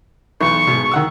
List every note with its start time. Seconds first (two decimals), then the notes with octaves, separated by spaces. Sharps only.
0.41 B1 E2 C#6
0.67 G#2 B2
0.91 D#3 F#5 E6